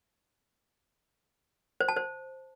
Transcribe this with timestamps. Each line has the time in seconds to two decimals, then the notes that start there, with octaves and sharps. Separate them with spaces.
1.80 C5
1.88 A5
1.96 C5